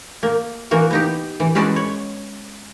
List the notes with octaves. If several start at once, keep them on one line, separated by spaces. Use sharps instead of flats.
A#3
E3 A#3 F#4
B3 D#4 G4
E3
G#3 C#4 F#4 B4 D5 A5
C#5